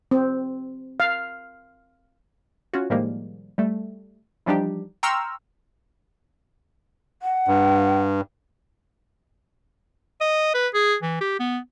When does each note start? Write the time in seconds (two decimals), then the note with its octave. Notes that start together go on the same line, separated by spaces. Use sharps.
0.11 C4
1.00 F5
2.73 C#4 F4 F#4
2.90 A2 D#3 F3 G3 G#3 A#3
3.58 G3 A3
4.46 E3 F3 G3 D4 D#4 G4
5.03 G5 A#5 C6 C#6 E6 F6
7.22 F#5
7.48 G2
10.21 D#5
10.54 B4
10.74 G#4
11.02 E3
11.21 G4
11.39 B3